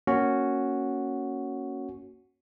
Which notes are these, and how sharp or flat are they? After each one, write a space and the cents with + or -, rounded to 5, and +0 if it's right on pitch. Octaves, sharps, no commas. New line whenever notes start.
A#3 +0 C#4 +0 F#4 +0